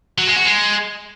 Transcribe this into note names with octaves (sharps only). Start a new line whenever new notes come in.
F#3
G#3
F#4
G#3